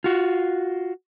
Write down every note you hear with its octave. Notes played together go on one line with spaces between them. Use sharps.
F4 F#4